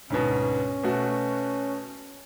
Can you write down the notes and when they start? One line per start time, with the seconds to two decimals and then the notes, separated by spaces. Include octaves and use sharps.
0.10 D2 G#2 B2 C#4
0.83 B2 A3 F#4